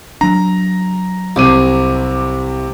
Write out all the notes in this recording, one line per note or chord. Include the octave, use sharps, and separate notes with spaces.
F#3 D4 A#5
C2 C3 D6 D#7